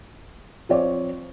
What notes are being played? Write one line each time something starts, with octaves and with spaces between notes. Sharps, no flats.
F3 C4 C#5 D5